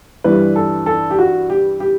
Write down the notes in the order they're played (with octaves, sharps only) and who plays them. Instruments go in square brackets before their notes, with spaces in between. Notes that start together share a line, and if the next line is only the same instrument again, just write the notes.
[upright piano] G2 E3 G3 B4
A4
A4
G4
F#4
G4
G4